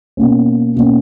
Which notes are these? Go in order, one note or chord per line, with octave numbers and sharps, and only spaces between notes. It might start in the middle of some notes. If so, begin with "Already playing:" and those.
B2 A#3 C#4
B2 A#3 C#4